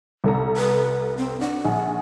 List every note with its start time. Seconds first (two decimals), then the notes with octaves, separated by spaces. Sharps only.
0.24 C2 A4 A#5
0.57 B4
1.17 C4
1.41 D4 F#5
1.64 A#1 G#4